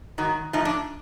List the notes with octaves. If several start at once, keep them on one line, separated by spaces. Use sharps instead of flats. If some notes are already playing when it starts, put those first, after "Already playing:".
G#2 D#3 F#3
A2 F3 D#4
D4